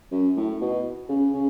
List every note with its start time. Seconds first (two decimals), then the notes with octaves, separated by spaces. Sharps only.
0.11 F#2
0.37 A2
0.61 B2
1.09 C#3
1.33 C#3